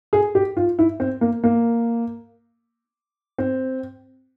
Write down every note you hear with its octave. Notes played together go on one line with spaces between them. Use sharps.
G#4
G4
F4
E4
C4
A#3
A#3
C4